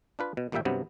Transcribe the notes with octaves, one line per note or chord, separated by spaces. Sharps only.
D4 F4 B4
B2
G#1 A#2 G3 A#3 E5 G5
G2 C3 F#3 B3